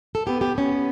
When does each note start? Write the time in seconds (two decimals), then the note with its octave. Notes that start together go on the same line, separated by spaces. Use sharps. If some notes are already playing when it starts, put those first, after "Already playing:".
0.15 A4
0.27 B3 G4
0.41 G4
0.57 B3 C#4